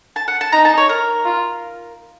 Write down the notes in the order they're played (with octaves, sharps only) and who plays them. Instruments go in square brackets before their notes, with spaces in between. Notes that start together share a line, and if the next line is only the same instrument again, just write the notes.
[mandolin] A5
F#5
A5
[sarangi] D#4 [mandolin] A#5
[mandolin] A5
C#5
A#4
[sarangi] F4